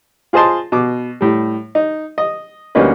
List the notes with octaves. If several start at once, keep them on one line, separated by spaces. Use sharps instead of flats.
F4 G#4 C5 D#5 A5 C6
B2 D6
A2 G3
D#4
D#5
D2 G3 A#3 C#4 D#4 B4